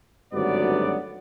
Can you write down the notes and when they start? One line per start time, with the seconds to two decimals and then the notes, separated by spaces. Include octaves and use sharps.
0.33 G#1 D2 G2 F#3 B3 D5